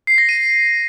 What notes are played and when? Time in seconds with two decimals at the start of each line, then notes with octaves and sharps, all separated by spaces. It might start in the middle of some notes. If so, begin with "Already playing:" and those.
0.07 C7
0.18 A#6
0.29 D#7